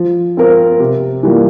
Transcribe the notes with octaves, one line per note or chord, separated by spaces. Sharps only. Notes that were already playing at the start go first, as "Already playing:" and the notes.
Already playing: F3
C4 F4 A#4
C3
E3 G3 A#3 F4